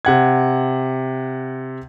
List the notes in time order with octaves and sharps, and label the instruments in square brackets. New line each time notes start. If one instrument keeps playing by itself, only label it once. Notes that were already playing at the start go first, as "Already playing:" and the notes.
[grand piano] C3 F#5 G#6